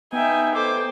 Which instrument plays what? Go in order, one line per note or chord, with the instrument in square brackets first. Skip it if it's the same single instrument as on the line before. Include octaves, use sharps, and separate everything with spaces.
[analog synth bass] B3 [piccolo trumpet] D#4 [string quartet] E5 G5 G#5
[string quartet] A4 C5 G5 [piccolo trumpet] D6